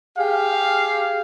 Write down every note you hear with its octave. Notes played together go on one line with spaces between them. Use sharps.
G4 G#4 F5